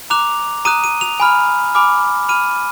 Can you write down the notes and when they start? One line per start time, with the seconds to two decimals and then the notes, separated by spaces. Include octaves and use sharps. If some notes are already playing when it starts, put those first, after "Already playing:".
0.10 A#5 D6 F#6 F7
0.65 A#5 D#6 F#6 D#7
0.84 D#7
1.01 F7
1.20 G#5 B5 F6
1.75 G#5 B5 D6 F6
2.29 B5 F6 D#7